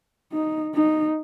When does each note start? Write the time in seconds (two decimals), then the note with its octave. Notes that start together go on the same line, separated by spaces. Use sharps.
0.32 D#4
0.75 D#4